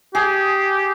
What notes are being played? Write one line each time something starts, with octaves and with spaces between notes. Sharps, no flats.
G4 G#4